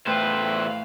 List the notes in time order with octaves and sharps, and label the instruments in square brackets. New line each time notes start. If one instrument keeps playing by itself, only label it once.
[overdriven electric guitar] E2 C5 [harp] A2 [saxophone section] F4 A4 B4 [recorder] G5
[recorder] F5